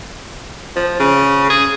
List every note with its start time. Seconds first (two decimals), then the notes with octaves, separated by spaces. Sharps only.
0.76 F3
1.00 C#3
1.50 G#4